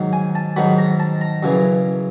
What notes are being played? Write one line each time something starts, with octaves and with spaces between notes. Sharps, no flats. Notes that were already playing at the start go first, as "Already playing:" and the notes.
Already playing: G#2 D#3 F#3
G#5
A5
G#2 D#3 F#3 B5
A#5
A5
A#5
F#2 C#3 E3